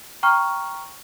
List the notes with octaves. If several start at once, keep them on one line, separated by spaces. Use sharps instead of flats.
G5 A#5 C#6 F6